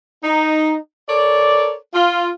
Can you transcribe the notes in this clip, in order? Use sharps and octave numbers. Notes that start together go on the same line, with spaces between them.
D#4
A4 A#4 C#5 D5
F4